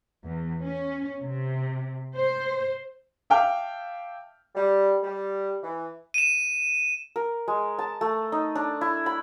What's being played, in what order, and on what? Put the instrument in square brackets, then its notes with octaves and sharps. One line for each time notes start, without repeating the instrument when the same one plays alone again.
[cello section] E2
C#4
C3
C5
[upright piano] E5 F5 G5 A5 D6 F6
[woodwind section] G3
G3
E3
[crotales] D#7 E7
[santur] A#4
G#3
A5
A3
D#4
D4
E4
B5